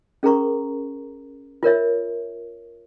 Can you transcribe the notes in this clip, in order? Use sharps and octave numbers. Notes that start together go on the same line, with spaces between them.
C#4 G#4 A#4 A#5 C#6
F4 A#4 C#5 E5